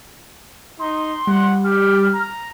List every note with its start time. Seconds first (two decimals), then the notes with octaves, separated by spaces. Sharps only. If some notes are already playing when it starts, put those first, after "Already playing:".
0.80 D#4 C6
1.27 G3 F#5
1.64 G4 F6
2.13 A#5